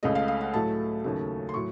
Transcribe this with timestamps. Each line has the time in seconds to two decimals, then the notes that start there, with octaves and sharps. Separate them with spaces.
0.03 C#2 C#3 A3 D#5
0.15 F5
0.28 F5
0.41 F#5
0.53 A2 F#3 A3 A5
1.04 D#2 C#3 F#3 A3
1.49 C6
1.54 A2 F#3 C#6